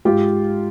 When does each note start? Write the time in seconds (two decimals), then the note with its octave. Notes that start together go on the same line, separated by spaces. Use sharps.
0.05 G#2 F4 G4